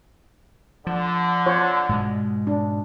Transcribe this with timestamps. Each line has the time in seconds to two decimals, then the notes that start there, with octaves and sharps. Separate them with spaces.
0.87 D3 F3
1.46 F4 C5 C#5
1.89 G#2 B2 G#3
2.47 D4